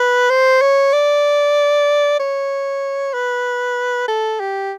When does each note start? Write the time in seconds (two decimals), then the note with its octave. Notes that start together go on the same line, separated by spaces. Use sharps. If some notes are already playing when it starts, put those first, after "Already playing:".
Already playing: B4
0.30 C5
0.61 C#5
0.93 D5
2.19 C#5
3.14 B4
4.08 A4
4.40 G4